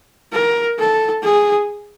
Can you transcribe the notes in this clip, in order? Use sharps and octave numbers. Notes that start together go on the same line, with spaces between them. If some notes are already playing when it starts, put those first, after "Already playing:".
A#4
A4
G#4